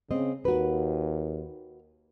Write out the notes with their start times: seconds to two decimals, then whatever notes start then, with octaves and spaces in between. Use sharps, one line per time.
0.11 C#3 C4 D#5
0.45 D#2 F#4 A#4 B4